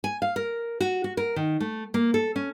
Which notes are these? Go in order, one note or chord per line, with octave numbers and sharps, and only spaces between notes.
G#5
F5
A#4
F#4
F#4
A#4
D#3
A3
A#3
A4
C#4